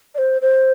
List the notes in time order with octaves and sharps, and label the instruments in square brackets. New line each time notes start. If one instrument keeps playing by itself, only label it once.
[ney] D5
C5
C5